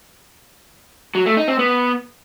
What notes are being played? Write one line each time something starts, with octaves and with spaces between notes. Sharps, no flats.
F#3
A3
D#4
C4
B3